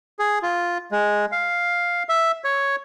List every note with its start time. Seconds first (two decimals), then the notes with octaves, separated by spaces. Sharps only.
0.19 G#4
0.42 F4
0.91 G#3
1.32 F5
2.09 E5
2.44 C#5